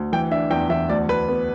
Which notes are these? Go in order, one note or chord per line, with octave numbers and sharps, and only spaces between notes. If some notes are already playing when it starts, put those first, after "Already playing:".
Already playing: D2
E3 G5
D4 E5
E2 G5
E2 E5
D2 D5
D2 B4
B3